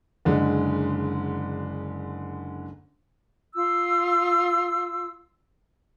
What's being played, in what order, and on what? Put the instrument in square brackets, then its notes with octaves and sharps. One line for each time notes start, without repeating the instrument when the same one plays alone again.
[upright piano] F#1 D3 G#3
[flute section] F4 E6